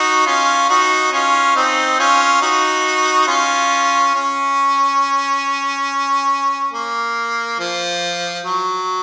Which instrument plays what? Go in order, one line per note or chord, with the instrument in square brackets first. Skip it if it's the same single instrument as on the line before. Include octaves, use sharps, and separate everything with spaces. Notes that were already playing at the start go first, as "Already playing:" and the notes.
Already playing: [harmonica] D#4 F#4
C#4 F4
D#4 F#4
C#4 F4
C4 D#4
C#4 F4
D#4 F#4
C#4 F4
C#4
A#3
F3
F#3